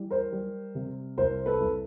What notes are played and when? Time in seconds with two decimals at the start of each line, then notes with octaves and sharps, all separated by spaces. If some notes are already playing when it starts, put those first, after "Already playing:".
Already playing: E3 G3
0.10 A#4 C5
0.32 G3
0.75 C3
1.17 C2 A#4 C5
1.46 A4 B4
1.60 C2